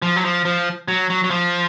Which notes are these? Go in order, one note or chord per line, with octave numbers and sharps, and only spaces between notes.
F3
F#3
F3
F3
F#3
F#3
F#3
F3